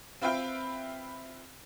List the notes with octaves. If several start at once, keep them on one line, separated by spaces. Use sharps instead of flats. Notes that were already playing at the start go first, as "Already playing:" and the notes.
C4 F4 B4 E5 F5 G5